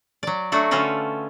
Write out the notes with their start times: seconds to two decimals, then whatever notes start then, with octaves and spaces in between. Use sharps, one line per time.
0.23 F#3 D5
0.52 F#3 A3 D4 F#4
0.71 D3 C#4 F4 F#4 B4